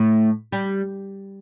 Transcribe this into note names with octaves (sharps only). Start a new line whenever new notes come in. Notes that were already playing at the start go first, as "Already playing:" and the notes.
Already playing: A2 A3
G3